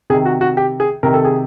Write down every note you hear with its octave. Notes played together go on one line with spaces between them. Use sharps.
C3 D#3 G#4
F#4
F#4
G4
G#4
C3 D#3 A#4
A4
G#4